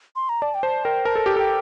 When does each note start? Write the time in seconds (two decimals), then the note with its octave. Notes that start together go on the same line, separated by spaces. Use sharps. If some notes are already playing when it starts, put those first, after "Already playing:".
0.16 C6
0.29 A#5
0.42 D5 A5
0.54 G5
0.63 C5 A5
0.84 A#4 G5
1.05 A#4 A5
1.16 A4
1.26 G4
1.36 A4 G5